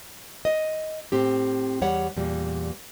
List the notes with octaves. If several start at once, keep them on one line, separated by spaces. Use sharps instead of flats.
D#5
A2 C4 G4
E2 G3 C#5 F#5
E2 A#2 G3